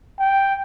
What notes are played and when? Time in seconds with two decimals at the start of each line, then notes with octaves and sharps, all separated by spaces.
0.19 G5